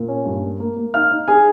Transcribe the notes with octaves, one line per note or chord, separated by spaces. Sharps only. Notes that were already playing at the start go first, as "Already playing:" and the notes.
Already playing: A#2
C#4
G2
A#3
A#3
A#3
D#4 F5 F6
D#4
D#4 G#4 G#5